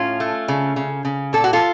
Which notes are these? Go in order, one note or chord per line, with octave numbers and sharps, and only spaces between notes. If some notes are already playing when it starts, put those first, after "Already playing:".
Already playing: A2 C#4 F4
A3
C#3
C#3
C#3
A#2 A4
F#4
F4 A4